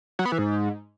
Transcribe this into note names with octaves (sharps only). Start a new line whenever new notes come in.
F#3
B3
E3
G#2